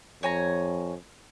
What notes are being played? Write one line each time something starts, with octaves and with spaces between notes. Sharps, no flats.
F2 C#5 G#5 A#5